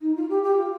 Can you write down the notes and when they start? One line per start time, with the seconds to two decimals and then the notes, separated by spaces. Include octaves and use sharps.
0.01 D#4
0.15 F4
0.29 G4
0.43 G4
0.56 F4